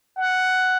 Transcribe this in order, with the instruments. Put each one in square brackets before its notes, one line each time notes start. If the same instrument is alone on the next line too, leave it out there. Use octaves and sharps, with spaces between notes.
[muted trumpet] F#5